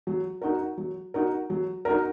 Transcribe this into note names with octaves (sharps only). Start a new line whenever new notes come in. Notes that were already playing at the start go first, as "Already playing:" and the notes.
F#3
D#4 F#4 A#4
F#3
D#4 F#4 A#4
F#3
D#4 F#4 A#4